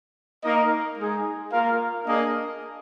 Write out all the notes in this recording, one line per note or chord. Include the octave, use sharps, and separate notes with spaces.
A#3 D#4 A#4 D#5
G#3 D#4 G#4
A#3 F4 A#4 F5
A#3 D4 G#4 D#5